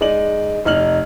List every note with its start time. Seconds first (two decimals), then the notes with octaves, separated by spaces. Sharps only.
0.01 G#3 D#4 D5 F#7
0.65 F1 D#4 F6 F#7